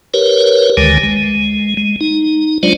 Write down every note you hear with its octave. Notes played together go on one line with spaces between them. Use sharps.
G4 A#4 B4 C#5
D2 D3 D#3 G#3 G#5
G#3
G#3
D#4
F#3 G#3 D4 F4 C5 D5